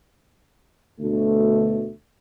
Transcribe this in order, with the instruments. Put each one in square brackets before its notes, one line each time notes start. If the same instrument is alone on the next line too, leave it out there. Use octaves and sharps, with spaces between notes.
[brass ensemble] D2 B2 A3